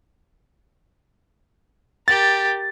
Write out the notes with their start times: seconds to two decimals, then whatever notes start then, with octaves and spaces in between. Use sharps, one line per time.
2.08 G4 A#4 A6